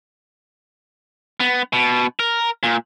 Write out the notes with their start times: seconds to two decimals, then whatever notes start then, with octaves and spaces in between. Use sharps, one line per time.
1.40 B3
1.73 B2
2.20 A#4
2.63 A#2